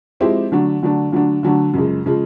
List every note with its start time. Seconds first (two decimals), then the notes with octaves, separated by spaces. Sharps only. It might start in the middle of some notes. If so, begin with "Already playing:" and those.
0.20 F3 G#3 C4 E4 G4
0.52 D3 F#3 A3 D4
0.83 D3 F#3 A3 D4
1.12 D3 F#3 A3 D4
1.43 D3 F#3 A3 D4
1.74 F#2 C#3 F3 G#3
2.06 C#3 F3 G#3